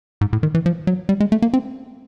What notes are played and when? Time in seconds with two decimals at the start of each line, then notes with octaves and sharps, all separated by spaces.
0.21 G#2
0.33 A2
0.43 D#3
0.55 E3
0.66 F3
0.87 F#3
1.09 G3
1.20 G#3
1.32 A3
1.42 A#3
1.54 C4